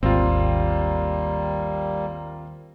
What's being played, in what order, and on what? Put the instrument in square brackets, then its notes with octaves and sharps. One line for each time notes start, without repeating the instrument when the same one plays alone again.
[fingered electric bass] G#1 [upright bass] D#2 [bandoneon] G3 A#3 [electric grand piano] C4 F4